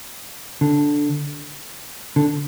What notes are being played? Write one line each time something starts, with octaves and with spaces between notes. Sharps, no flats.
D3
D3